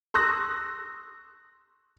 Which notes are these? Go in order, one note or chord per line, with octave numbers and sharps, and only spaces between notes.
C6 C#6 D#6 E6 F#6 A#6